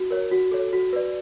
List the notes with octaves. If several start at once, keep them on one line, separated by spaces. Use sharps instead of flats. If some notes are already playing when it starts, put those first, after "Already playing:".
Already playing: F#4
A#4 C#5
F#4
A4 C#5
F#4
B4 D5